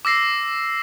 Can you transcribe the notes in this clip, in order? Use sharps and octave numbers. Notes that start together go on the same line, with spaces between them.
D6 E6 A#6 C7